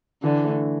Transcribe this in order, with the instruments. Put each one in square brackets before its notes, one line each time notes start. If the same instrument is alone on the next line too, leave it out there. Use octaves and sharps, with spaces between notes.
[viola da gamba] D3 [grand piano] E3
[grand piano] A3